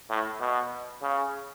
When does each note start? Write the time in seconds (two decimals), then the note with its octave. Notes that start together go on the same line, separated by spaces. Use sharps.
0.10 A2
0.41 B2
1.02 C#3